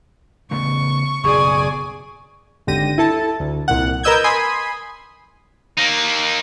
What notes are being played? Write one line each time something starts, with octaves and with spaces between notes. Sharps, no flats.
C#3 A3 B3 C#6
F#1 B1 G#4 D5 G#5 C#6
G#1 D#2 D3 G4 A#6 D#7
E4 A4 A5
D2
C2 A#2 F#5
A#4 B4 D#5 E6 G6 G#6
G#5 B5 C6 D#6
A#3 D#4